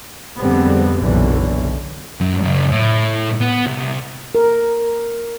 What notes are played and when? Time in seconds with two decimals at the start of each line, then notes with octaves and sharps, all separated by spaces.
0.38 F2 D3 G3 G#3 B3 C4
0.99 F#1 B1 F#2 A#2 D3 E3
2.21 F#2
2.43 F#2 C#3
2.72 A2
3.41 B3
3.66 C2
4.35 A#4